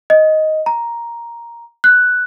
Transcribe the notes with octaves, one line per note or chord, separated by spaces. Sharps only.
D#5
A#5
F#6